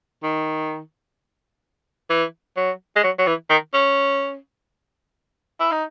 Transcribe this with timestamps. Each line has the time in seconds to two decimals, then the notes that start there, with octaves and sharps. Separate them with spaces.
0.23 D#3
2.10 E3
2.56 F#3
2.96 G#3
3.03 F#3
3.19 F#3
3.27 E3
3.50 D#3
3.74 C#4
5.60 E4
5.72 D#4